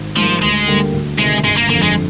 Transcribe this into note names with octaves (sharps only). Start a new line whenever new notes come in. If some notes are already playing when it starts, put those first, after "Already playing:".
Already playing: G#1
G#2 F3 G3 A#3
D2 G#3
D3 G3 A#3
D2
C3 D#3 G#3
G1 G#3
A#3
F2 D3 A#3
G#3